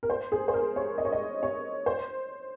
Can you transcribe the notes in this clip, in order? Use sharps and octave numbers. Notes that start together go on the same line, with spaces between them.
A#4
C5
G#4
C5
A#4
C#5
D#5
C#5
D#5
C#5
C5